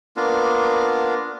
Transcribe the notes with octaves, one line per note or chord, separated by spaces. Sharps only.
A#3 B3 D4 F4